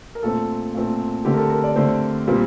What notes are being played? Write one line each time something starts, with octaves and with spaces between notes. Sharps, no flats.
A#4
A#2 A3 C4 A4
A#2 A3 C4
D3 A3 C4 G4
A#4
A4
A#4
D5
D3 A3 C4 C5
A#2 G3 C4